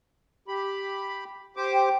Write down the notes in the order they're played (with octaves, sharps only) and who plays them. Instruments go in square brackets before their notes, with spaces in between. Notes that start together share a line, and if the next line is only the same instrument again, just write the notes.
[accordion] G4 B5
G4 C5 D6
[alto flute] G5